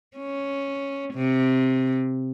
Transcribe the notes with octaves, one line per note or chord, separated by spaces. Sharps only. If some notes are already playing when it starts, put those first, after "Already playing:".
C#4
C3